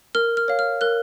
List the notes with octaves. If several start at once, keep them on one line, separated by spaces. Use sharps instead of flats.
A#4 F6
F6
C#5 F5
F6
A#4 F#6